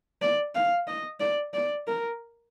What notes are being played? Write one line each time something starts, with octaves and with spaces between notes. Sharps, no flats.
D5
F5
D#5
D5
D5
A#4